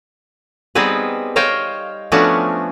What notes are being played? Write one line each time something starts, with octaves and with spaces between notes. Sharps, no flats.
G3 B3 C4 D#4 G#4 B4
C5 C#5 D#5 F5 G5
F3 A3 B3 C#4 D4 F#4